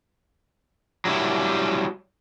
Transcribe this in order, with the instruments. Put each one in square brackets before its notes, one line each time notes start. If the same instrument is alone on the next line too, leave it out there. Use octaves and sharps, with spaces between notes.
[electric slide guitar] F#3 G3 E4